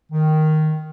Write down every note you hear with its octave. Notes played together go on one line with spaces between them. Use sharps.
D#3